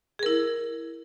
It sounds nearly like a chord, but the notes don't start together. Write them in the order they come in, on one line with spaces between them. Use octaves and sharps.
G#4 A#4 E4